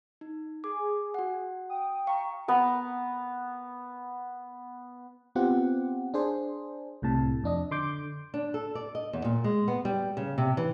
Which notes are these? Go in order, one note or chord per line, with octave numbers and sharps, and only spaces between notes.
D#4
G#4 D6
F#4 F#5
G5 D#6
F5 A#5 C#6
B3 A#5
B3 C4 F4 G4 F#5
D4 G#4 C5
C2 A2 C3 A5
F2 D4 D#5
D3 C6 D6 G6
D4
A4
D5
D#5
E2
A#2
G#3
B3
G3
C#3
C3
E3